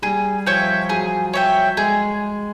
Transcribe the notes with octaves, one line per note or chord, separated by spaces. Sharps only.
G3 G#4
F3 C#5 E5 G5
F#3 G#4
C#5 E5 G5
G#3 G#4